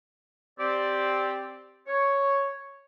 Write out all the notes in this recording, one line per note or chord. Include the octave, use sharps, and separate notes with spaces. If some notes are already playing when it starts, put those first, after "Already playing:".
C4 G4 D5
C#5